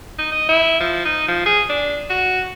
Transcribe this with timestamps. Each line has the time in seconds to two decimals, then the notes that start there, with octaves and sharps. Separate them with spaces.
0.18 D#4
0.32 D#5
0.49 E4
0.80 F3
1.05 D#4
1.28 F3
1.46 G#4
1.69 D4
2.10 F#4